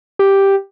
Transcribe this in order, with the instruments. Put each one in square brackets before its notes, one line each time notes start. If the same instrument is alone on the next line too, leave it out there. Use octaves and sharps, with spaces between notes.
[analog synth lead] G4